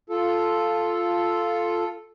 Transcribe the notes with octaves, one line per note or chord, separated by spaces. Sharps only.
F4 A4